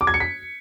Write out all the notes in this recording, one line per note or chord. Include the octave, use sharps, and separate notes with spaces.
D6
G#6
C#7
B6